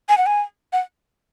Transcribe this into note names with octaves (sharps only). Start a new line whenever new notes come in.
G#5
F#5
G#5
F#5